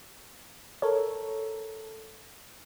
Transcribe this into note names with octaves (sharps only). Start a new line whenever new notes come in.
A4 A#4 C#5